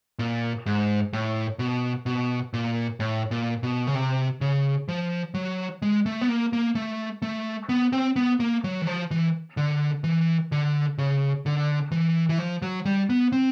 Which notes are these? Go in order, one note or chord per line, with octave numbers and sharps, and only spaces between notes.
A#2
G#2
A2
B2
B2
A#2
A2
A#2
B2
C#3
C3
C#3
F3
F#3
G#3
A3
B3
A#3
A#3
A3
A3
B3
C4
B3
A#3
F#3
E3
F3
E3
D3
E3
D3
C#3
D3
E3
E3
F3
F#3
G3
B3
C4